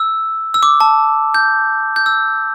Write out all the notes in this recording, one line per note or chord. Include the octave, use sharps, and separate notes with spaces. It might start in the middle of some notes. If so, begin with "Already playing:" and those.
Already playing: E6
E6
D6
A5
G6
G6
E6